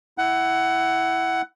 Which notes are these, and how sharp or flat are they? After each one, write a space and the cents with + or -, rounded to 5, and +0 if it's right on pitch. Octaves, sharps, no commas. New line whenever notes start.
E4 +0 F#5 +20